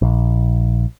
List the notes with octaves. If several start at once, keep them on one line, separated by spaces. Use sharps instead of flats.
A#1